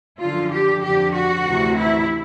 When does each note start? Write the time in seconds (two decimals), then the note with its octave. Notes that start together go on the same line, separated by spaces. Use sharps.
0.20 F#2 D3 F3 F4
0.51 G4
0.83 F2 D3 F3 G4
1.14 F#4
1.46 D2 C3 E3
1.78 E4